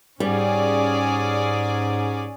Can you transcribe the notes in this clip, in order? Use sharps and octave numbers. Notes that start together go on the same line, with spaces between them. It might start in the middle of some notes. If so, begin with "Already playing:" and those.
G#2 G3 C#4 G#4 D5